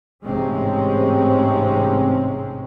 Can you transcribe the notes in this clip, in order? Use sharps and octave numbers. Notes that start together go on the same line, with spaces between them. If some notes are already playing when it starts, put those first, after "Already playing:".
A1 G#2 C3 G#3 C4 C#4